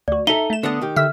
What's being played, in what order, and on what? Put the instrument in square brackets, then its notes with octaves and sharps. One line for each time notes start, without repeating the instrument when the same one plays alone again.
[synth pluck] D2 F#4 [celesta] D5
[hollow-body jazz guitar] D#4 A4 [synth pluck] E5 A#5 [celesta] G7
[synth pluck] A3 E7
[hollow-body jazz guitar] D3 B3 D4 [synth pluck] D#6
[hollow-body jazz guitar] D#3 G4
[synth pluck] D3 E5 E6 [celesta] F6